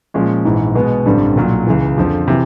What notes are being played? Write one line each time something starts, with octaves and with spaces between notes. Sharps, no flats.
A#2 F3 G#3 C#4
A#1 G#2 E3
B2 G#3 B3
A1 G2 D3 G3 C4
B1 A#2 F#3
C#2 C#3 E3
F2 D3 F3
C3 E3